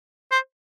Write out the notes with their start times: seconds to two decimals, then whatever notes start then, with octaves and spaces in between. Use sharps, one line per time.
0.31 C5